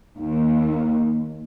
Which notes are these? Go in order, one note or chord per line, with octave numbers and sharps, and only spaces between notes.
D#2